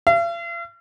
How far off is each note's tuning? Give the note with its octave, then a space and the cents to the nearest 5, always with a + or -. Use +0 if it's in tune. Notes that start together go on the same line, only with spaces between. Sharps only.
F5 -45